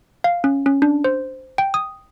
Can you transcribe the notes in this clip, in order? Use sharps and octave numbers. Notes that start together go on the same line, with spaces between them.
F5
C#4
C#4
D4
C5
G5
D#6